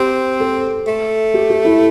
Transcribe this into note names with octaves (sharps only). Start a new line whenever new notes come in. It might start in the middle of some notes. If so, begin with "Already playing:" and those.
Already playing: C4 G4
A4
A3
G4
G4
E4